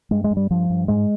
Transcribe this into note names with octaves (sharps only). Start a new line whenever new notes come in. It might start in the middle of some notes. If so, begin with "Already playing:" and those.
G2 G#3
G#3
G2
G3
G2 F3
G2
G#2 G#3